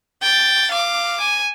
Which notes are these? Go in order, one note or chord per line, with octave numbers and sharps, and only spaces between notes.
G5 A6
F5 D6
G#5